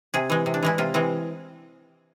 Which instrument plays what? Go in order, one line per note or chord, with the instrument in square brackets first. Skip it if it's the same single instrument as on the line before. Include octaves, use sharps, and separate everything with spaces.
[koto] C3 G#4
E3 G#3
C3
D4
E3 G#3 E4
C3 F4
E3 G#3 C4